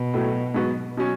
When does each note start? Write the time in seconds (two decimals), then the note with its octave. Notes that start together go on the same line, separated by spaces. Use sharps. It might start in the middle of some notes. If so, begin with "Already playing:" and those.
Already playing: B2
0.14 A2 F#3 A3
0.55 G#2 F#3 B3 F#4
0.97 B2 F#3 C#4